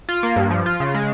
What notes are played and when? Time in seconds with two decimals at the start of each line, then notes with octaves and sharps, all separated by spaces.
0.09 F4
0.23 A#3
0.36 G2
0.50 F3
0.66 F4
0.80 C#3
0.94 G#3